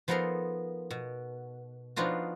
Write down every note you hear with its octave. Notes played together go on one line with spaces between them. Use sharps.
F3 B3 D#4 A4 A#4 C6
B2
F3 B3 D4 D#4 F4 F#4